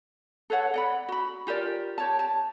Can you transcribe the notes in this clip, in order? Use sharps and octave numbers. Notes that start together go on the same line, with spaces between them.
A4 B4 C#5 F#5
D5 F#5 B5
F#4 B5
F4 G4 A#4 D5
G4 C#5 A5
A5